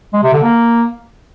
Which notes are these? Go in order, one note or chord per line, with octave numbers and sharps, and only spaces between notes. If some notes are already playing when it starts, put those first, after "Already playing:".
G#3
C3
D3
A#3